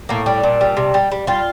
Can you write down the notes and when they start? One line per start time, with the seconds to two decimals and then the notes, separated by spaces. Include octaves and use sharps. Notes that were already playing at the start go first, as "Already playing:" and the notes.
0.09 A2 A#3
0.26 G3 D4
0.43 A#2
0.61 G3
0.77 C3
0.94 G3
1.12 G3
1.27 G3 F4